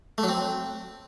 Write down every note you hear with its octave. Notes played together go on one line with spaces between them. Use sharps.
A3
F#3
C4